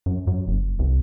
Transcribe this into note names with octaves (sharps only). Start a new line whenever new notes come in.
F#2
F#2
F#1
C2